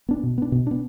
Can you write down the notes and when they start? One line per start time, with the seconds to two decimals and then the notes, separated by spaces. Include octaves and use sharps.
0.09 B3 D4
0.23 B2
0.38 B3 D4
0.52 B2
0.67 B3 D4